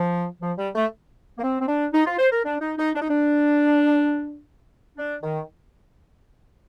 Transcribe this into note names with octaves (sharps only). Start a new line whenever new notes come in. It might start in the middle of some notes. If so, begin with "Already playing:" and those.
Already playing: F3
F3
G3
A3
A#3
C4
C4
D4
D#4
F4
C5
A#4
D4
D#4
D#4
D4
D#4
D4
D4
D#3